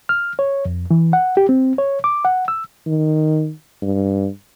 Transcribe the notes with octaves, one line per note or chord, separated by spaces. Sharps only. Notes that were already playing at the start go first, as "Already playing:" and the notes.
F6
C#5
F2
E3
F#5
G4
C4
C#5
D6
F#5
E6
D#3
G2